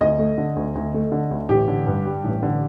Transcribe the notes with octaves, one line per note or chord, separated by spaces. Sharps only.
D2 D#5
A3
D3
D2
D2
A3
D3
D2
A1 G4
D3
G2
G3
A1
D3